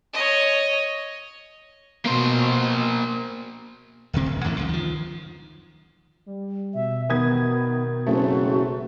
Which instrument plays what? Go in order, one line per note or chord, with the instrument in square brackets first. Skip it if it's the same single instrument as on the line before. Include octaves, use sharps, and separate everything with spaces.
[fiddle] C#5 D#5
[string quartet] B2 [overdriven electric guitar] A#3 C5
[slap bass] D1 G1 C3 C4
D1
A1 F2 E3
C#2 F#2 D3
D#3 F3
[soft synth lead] G3
[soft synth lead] B2 [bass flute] E5
[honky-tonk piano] D#3 D#6 G#6 [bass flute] B3
[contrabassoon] F#1 [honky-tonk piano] A3 C4 [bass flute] F#4